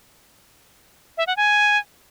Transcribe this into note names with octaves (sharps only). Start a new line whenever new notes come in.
E5
F#5
G#5